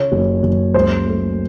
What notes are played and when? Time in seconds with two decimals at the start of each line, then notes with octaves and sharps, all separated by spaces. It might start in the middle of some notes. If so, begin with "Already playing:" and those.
Already playing: C#3 C#5
0.12 F#1
0.43 F#1
0.74 C#2 C5
1.06 A3